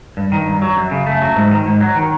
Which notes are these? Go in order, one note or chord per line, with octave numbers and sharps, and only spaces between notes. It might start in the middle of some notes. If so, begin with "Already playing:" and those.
G2
D#3
G2
F#3
F#2
C#3
A3
F#3
G#2
D#3
G#2
F#3
D#3